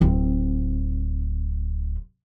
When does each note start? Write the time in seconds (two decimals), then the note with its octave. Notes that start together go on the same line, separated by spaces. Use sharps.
0.01 D1 C4